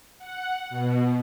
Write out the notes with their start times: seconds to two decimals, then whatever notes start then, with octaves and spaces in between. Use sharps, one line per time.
0.19 F#5
0.70 B2